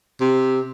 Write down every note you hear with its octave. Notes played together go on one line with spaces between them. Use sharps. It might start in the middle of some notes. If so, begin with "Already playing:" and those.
C3